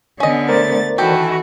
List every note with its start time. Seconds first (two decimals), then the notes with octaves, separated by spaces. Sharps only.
0.20 D3 B3 C#4 D#5
0.49 A3 A#4 C5 D5 A6
0.98 D#3 E3 A3 F#4 G4 A4